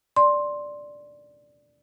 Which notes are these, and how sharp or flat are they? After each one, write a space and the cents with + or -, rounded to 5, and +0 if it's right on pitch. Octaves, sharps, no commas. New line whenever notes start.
D5 +0 C6 +10